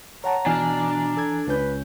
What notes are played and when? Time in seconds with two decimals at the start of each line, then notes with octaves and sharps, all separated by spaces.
0.24 C#5 F#5 A5 A#5
0.46 B2 E3 D4 G#5 A5 F6
1.17 A4 G#6
1.47 C#2 C#4 B4 G6